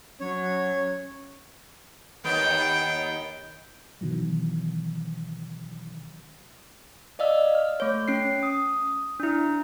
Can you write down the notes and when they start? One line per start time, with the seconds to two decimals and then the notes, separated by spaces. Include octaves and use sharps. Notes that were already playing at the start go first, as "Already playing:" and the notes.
0.20 F#3 C#4 C#5
2.24 D#2 D#3 B3 G5
4.01 B2 D#3 E3 F#3
7.19 D5 D#5 F5 E6
7.55 F6
7.80 A3 C#5
8.08 C#4 C7
8.43 D#6
9.20 D4 E4